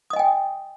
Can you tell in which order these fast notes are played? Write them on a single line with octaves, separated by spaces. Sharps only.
D#6 D#5 G#5 G5